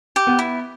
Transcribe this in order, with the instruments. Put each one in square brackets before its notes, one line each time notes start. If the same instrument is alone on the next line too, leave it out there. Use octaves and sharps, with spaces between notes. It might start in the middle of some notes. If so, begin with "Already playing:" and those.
[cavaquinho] G4
[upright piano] B3
[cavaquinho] E4